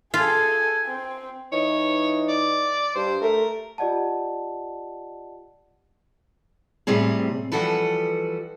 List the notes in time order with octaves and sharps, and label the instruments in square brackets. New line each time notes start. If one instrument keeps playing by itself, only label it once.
[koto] F4 [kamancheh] G#4 A4 [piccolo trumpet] G#5
[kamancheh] C4
[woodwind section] E3 D#4 [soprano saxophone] C#5
[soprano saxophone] D5
[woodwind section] G2 [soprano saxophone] C5
[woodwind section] A3 [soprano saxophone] A#4
[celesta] F4 G4 D5 D#5 F#5 A5
[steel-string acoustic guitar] A2 C3 G3 C4 G#4
E3 F3 G3 F#4 A4 B4